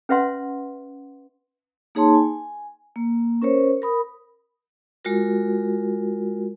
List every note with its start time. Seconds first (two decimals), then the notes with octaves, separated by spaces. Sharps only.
0.09 C#4 B4 E5 F#5 C6
1.95 A#3 D#4 G#4 C#5 A5 C6
2.15 G#5
2.96 A#3
3.42 C#4 A#4 C5 C#5
3.82 A#4 B5 D#6
5.05 G#3 F4 F#4 A#4